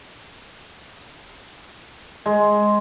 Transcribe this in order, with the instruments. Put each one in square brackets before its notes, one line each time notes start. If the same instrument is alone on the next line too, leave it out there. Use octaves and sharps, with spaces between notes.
[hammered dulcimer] G#3